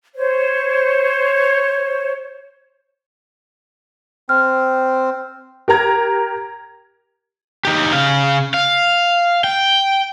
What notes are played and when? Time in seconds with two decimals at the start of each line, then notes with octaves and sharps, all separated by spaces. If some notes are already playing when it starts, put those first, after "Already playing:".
0.14 C5 C#5
4.29 C4 F6
5.68 G4 A#4 A#5 G#6
7.65 D#4 G4
7.93 C#3 F5
8.54 F5
9.44 G5